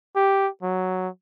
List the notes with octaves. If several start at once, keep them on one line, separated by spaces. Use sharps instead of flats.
G4
F#3